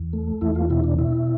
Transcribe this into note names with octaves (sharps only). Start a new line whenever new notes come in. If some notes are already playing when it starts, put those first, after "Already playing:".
Already playing: E2
A3
E2 E4
F4
B2 E4
D4
B2 E4